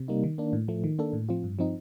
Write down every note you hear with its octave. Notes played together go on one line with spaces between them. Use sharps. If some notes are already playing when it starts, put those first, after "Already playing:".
Already playing: C3
G3 A#3 D#4
D#3
A#3 D4
A2
F3 A3
D#3
A#3 D4 A4
A2
F3 C4 F4
G2
F3 C4 D#4